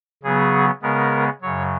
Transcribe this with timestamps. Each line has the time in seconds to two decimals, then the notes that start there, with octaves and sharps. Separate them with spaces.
0.23 C#3 F#3 B3 G#4
0.82 C#3 G#3 B3 A#4
1.41 F#2 C#3 F#3 C#5